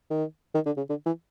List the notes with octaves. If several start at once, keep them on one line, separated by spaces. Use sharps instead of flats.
D#3
D#3
D3
C#3
D3
E3